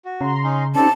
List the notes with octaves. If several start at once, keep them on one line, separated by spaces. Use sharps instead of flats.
F#4
C#3 A#5 C6
C#4 D#4
C4 C#4 D#4 G4 A4 D5 A5